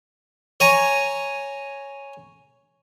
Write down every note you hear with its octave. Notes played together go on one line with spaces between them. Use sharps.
C#5 G#5 A#5